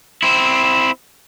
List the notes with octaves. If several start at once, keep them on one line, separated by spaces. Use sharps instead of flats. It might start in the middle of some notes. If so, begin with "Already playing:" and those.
C4 E4